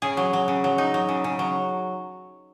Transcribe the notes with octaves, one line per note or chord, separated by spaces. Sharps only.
C#3 G#4
F#3
F#3
C#3
F#3
D#4
F#3
C#3
C#3
F#3